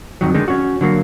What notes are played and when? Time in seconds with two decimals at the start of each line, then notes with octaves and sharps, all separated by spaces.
0.21 F2 C3 D#3 F#3
0.34 D3 D#3 G#3 D#4
0.48 C#4 F#4
0.81 D3 F#3 A#3